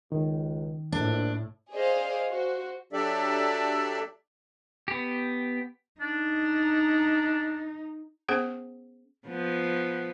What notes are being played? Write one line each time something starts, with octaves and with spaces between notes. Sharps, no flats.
C#2 D#3
A#1 A2 D4
G#4 C5 D5 D#5 F5
F#4 C5
F#3 D4 G4 A4 D5 E5
B3 G4
D4 D#4
B3 C#4 G#4 C5 F#5
F3 B3